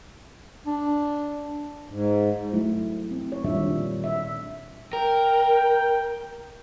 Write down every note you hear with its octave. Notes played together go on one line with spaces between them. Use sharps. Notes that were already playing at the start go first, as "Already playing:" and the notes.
D4
G#2
F#3 A3 E4
C4
C#5
A#2 D#3 G3 D4 C#5 E5
E5
A#4 G5